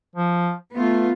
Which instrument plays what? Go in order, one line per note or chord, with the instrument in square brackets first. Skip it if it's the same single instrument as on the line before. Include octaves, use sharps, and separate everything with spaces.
[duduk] F3
[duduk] A3 [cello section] B3 F4